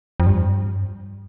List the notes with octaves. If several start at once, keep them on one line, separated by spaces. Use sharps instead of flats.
F2
G2